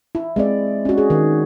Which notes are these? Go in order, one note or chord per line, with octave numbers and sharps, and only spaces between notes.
E4
G#3 C4 D5
C#4 F#4
G#4
D#3